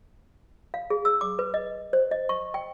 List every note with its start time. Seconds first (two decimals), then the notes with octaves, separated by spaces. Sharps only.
0.74 F5
0.90 G#4
1.05 E6
1.21 D6
1.39 B4
1.54 D#5
1.93 C5
2.11 D#5
2.29 C#6
2.54 G5